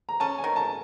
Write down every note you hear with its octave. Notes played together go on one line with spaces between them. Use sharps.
A#5
C#4 A5
G#5
D#3
A5